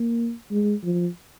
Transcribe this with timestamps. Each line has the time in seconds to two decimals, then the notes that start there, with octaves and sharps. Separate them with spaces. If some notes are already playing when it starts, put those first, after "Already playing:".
Already playing: A#3
0.51 G#3
0.84 F3